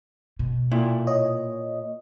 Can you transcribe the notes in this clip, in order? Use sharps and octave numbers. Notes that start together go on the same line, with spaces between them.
B2
A#2 E4
C#5 D#5